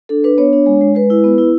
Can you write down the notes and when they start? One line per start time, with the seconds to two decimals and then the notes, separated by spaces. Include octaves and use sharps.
0.09 D4 A4
0.24 D4 B4
0.38 B3 C#5
0.53 D4
0.66 G#3
0.81 G#3
0.95 G#3 B4
1.10 E4
1.24 B3
1.38 E4